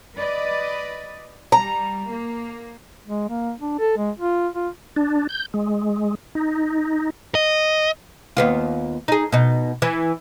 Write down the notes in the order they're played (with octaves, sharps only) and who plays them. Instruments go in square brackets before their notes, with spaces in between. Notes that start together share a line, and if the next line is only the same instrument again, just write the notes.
[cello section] B4 D5 D#5
[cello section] G3 [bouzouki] A#5
[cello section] A#3
[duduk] G#3
A#3
D4
A4
G#3
F4
F4
[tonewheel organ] D4
G6
G#3
D#4
[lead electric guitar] D#5
[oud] D#2 B3 F4
D#4 G#4
B2 D#4
E3